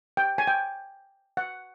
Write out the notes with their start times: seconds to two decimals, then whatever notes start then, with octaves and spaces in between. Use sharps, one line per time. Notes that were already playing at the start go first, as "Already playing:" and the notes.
0.17 G5
0.38 G#5
0.47 G5
1.37 F#5